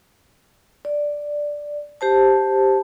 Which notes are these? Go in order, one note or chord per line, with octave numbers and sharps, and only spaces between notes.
D5
G4 C5 A5